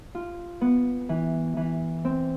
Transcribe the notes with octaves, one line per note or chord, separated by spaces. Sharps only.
F4
B3
E3
E3
C4